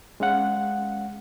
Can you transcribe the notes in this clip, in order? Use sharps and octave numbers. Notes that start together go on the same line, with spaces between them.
G#3 C#4 F5 F#5